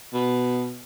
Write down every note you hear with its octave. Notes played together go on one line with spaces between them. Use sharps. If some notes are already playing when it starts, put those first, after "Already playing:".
B2